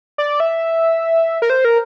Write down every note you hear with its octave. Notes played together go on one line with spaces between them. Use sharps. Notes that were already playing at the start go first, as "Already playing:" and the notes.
D5
E5
A#4
C5
A#4